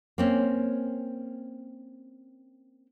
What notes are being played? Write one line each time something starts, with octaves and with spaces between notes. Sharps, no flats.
A#3 C4 C#4